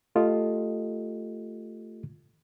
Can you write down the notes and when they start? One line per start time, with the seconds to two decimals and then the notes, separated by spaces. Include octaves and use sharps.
0.15 A3 F4 G4 A4 D#5